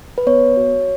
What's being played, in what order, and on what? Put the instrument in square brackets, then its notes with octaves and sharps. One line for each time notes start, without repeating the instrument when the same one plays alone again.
[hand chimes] B4
B3 C#5
F#4